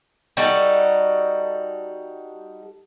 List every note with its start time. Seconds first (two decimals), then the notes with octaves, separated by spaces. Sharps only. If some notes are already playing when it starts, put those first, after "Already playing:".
0.37 G3 D#4 F#4 A4